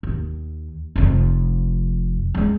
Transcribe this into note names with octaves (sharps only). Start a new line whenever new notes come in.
D#2
F1 F2
G#3 E4